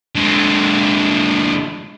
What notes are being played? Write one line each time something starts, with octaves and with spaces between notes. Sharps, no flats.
D3 G#3